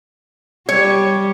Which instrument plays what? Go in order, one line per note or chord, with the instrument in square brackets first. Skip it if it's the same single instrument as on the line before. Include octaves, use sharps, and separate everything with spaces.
[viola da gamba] G3 [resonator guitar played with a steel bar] C#5